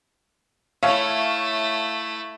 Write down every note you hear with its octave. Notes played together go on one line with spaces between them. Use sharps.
A3 E4 C#5 E5 F5